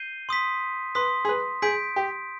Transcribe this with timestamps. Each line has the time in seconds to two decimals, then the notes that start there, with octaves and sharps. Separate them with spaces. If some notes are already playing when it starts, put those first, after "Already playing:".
Already playing: G6 C7 D#7 G7
0.29 C6 D#6 B6
0.95 B4 C6 D#6 B6
1.25 G#4
1.29 B4
1.62 G#4 G6 B6 D7
1.96 G4